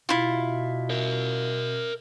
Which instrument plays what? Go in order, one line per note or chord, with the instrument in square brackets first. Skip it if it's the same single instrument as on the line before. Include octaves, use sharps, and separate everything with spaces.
[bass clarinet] B2 [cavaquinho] E4 F4
[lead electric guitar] A#4 E5